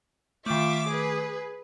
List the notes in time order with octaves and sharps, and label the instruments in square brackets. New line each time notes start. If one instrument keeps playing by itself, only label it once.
[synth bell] D#3 A3 [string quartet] F4 E5 D6
[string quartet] G#4 B4